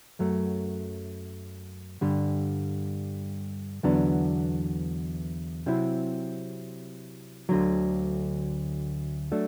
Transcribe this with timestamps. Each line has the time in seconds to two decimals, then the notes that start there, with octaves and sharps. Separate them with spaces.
0.19 F#2 F#3 A3
2.01 G2 D3 G3
3.83 E2 D3 F#3 B3 D4
5.66 C3 F#3 C4 E4
7.49 D2 D3 F#3
9.31 F#3 A3 D4